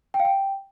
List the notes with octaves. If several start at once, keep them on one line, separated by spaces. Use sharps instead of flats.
G5
F5
G5